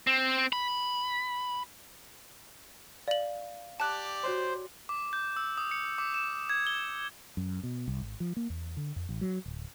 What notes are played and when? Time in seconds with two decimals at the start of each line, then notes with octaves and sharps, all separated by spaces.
0.07 C4
0.53 B5
3.08 D5 F5 F#7
3.80 G4 D5 A5 F#6
4.24 F#4 C5 C#5 C6
4.89 D6
5.13 G6
5.36 E6
5.58 D#6
5.71 C#7
5.98 D6
6.14 E7
6.50 G#6
6.67 G7
7.37 F#2
7.63 B2
7.88 C2
8.01 G#1
8.20 F3
8.37 A#3
8.50 E2
8.77 D3
8.96 F2
9.09 A1
9.21 F#3
9.46 D1